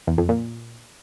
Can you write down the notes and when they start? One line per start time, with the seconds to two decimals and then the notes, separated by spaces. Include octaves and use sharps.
0.07 E2
0.18 F2
0.29 A#2